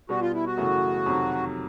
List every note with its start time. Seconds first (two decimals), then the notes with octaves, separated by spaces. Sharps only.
0.09 B2 G3 B3 F#4
0.21 F4
0.34 E4
0.46 F#4
0.57 F#2 C#3 E3 A3
1.06 F2 C3 D#3 F#3